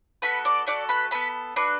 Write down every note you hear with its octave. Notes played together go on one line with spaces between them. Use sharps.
B3 F#4 A4 B4 B5
D5 D6
A3 F#4 A4 D5 D6
B4 B5
B3 F#4 A4 B4 B5
D4 F#4 A4 B4